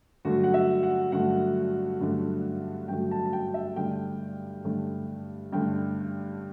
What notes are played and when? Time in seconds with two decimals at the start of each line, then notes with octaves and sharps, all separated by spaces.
0.25 G2 D3 F#3 A3 F#4
0.44 F#5
0.54 E5
0.83 F#5
1.12 G2 D3 F#3 A3 F#5
2.01 G2 D3 F#3 A3
2.88 G2 D3 F#3 A3 G5
3.11 A5
3.26 A5
3.33 G5
3.54 E5
3.76 G2 D3 A3 G5
4.65 G2 D3 A3
5.53 G2 D3 A3 G5